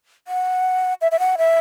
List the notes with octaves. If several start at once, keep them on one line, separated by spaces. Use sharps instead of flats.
F#5
E5
E5
F#5
E5